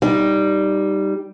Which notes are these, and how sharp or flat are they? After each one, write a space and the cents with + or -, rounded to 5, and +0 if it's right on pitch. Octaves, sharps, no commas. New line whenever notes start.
G3 -5 D#4 +0